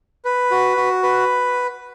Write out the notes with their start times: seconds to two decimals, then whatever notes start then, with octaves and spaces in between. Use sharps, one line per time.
0.25 B4
0.51 F#4
0.77 F#4
1.03 B4